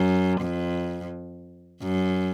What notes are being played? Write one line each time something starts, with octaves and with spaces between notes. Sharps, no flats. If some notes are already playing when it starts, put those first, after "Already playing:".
Already playing: F#2
F2
F#2